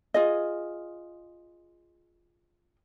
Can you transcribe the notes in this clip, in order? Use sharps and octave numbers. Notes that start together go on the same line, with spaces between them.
F4 G#4 D#5